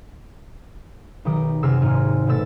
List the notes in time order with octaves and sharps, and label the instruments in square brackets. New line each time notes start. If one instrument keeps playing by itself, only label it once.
[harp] B1 D#3 G4 D#6 D7
F#2 C3 G#4 E6 F6
G#1 G#2 F6 D#7
B2 A3 E6 A6